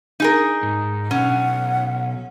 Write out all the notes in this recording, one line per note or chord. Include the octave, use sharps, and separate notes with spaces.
D#4 G#4 A#4
G#2
B1 C#4 F#5